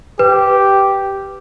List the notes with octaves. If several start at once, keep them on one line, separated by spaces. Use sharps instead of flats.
G4 B4